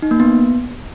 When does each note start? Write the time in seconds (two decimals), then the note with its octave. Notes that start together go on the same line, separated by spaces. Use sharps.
0.02 D#4
0.11 A#3
0.20 B3